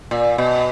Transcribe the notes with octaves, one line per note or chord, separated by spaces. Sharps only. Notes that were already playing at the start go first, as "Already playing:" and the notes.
A#2
B2